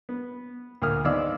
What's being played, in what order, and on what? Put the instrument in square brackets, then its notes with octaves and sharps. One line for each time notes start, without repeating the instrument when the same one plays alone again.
[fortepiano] B3
D2 A#2 A#3 D#6 F6
G#1 B3 D5 F5 D6 E6